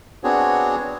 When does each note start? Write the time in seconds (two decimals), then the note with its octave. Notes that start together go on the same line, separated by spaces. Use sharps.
0.24 B3 C4 D4 F#4 G#4 C#5